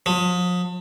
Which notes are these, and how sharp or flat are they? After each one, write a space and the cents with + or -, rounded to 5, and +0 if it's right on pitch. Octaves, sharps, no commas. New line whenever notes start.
F3 +40